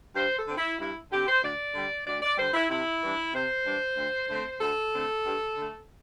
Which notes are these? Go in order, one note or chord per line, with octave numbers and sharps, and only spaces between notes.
G2 C5
A4
D3 C4
E4
G2 E4
D3 C4 G4
C5
D2 D5
D3 G3
D2 D5
D5
D3 G3 C5
E4
C3 E4
E3 G3 D4
C3 C5
E3 G3 D4
D2
D3 A3 C4
D2 A4
D3 A3 C4
G2
D3 A3